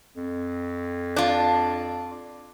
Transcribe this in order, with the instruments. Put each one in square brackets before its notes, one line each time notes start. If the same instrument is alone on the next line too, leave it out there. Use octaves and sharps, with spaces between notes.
[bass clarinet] F2
[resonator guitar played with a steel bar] D4 F4